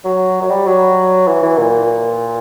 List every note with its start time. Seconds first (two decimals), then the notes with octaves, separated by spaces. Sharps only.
0.05 F#3
0.41 F#3
0.50 G3
0.66 F#3
1.27 E3
1.42 E3
1.58 A#2